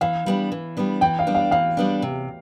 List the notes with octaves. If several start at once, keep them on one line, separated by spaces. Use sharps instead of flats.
E3 F5
G3 B3 D4
E3
G3 B3 D4
E3 G5
F5
G3 B3 D4
F5
E3 F5
G3 B3 D4
C3